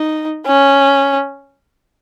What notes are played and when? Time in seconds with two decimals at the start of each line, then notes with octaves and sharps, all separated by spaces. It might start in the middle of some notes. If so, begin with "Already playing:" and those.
Already playing: D#4
0.47 C#4